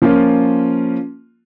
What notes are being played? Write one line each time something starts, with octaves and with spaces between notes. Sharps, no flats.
F3 A#3 C#4 F4